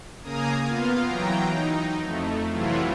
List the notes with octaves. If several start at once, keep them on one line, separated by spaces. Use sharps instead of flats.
C#3 A#3 G#5 A#5 D#6
B3 F4 F5
E3 F#3 G5 A#5
D#4
F2 A3
C3 E3 F#3 A3 E4 F4